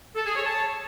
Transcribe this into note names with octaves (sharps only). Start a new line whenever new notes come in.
A4
G#4
C#5
A5